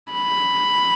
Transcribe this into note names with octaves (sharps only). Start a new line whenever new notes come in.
B5